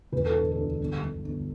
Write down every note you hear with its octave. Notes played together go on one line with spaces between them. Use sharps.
E1 B4
A4
D3
A4
D2
G1
G1
G1